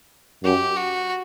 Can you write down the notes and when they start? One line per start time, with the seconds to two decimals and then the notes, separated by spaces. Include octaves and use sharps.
0.44 F#2 G4
0.76 F#4